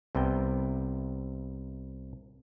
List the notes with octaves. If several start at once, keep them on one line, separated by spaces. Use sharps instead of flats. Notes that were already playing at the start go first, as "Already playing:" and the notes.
C2 C3 B3 G5